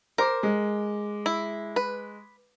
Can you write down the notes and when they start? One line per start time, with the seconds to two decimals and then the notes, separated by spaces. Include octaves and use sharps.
0.18 A#4 C5 D6
0.43 G#3
1.26 E4
1.76 B4